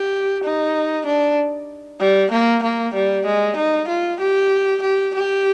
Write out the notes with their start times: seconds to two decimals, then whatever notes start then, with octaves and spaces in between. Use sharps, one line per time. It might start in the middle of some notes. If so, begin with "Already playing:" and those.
Already playing: G4
0.44 D#4
1.06 D4
2.00 G3
2.31 A#3
2.63 A#3
2.94 G3
3.26 G#3
3.57 D#4
3.88 F4
4.20 G4
4.82 G4
5.15 G4